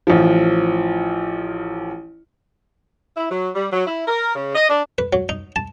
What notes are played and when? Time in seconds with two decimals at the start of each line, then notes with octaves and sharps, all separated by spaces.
0.07 A1 F3
3.16 E4
3.30 F#3
3.55 G3
3.72 F#3
3.87 E4
4.08 A#4
4.35 C#3
4.55 D#5
4.69 D4
4.98 B4
5.13 F#3
5.29 D#4
5.56 A5